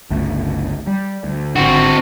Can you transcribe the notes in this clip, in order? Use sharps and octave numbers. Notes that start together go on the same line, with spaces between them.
G1 C#2 A3
G3
D2
G#1 D3 C4 F#4